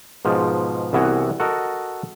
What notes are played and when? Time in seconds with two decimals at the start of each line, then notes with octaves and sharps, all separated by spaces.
0.25 G#2 B2 F3
0.93 C2 E3 B3 F#4 G#5
1.40 F#4 A4 A#4 D#5